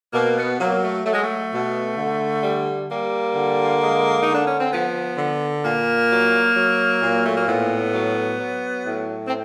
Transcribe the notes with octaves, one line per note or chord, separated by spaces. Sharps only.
B2 A#3
B3
F#3 A#3
A3
F#3 A3
G#3
A3
B2
D3
G3
G3 A#3
D3
G#3
D#4
D3
D4
C#4
C4
F3 B3
D3
A#2 A#3
F#3
F#3
A#2
A3
A#3
A2 B3
F#3
F#3
A2
C4